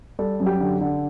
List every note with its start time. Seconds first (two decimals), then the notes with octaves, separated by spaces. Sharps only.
0.19 G3 A4
0.40 F#2
0.46 G4
0.60 D3
0.81 D3